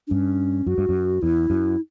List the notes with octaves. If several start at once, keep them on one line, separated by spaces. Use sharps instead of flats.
D4
G2 C#4
F#2 F#4
G2
F#2
E2 E4
F#2